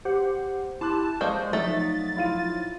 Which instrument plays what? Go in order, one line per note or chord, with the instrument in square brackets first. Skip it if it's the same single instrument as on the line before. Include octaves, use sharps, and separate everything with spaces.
[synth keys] G4 C5 F#5
[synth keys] E4 G4 [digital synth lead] A5 [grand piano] C6 F#6
[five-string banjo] G#3 [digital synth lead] C5 [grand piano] D5 F5 [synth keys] C#6
[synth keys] F3 F#3 D#4 [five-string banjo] A3 [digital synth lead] A6
[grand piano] E4 F4 D#7